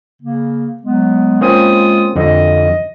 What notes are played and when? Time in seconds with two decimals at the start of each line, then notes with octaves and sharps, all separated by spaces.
0.22 C#3 A#3
0.82 F#3 G#3 B3
1.41 G#3 A#3 C4 C#4 F4 D#6
2.16 F2 D3 D#5